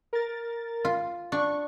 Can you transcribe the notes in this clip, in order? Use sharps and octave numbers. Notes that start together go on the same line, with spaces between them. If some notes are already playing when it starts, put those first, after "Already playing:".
A#4 A6
F4
D4 C#6